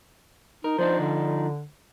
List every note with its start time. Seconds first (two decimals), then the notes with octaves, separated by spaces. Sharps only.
0.64 D#4 A#4
0.78 F3 D4 D#4 C5
1.00 D3